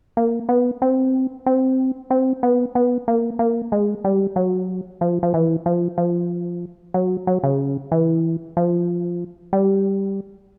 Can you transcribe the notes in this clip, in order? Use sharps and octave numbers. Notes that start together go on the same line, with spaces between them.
A#3
B3
C4
C4
C4
B3
B3
A#3
A#3
G#3
G3
F#3
F3
F3
E3
F3
F3
F#3
F#3
C#3
E3
F3
G3